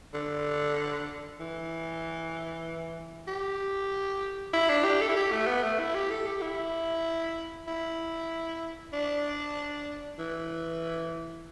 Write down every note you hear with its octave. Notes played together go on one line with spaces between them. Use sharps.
D3
E3
G4
E4
D4
G4
A4
E4
G4
A3
B3
A3
E4
G4
A4
G4
E4
E4
D4
E3